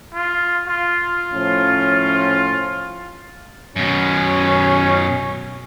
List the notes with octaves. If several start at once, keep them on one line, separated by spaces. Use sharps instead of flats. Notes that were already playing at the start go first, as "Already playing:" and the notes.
F4
F4
A2 F3 C#4
F#2 B2 C#4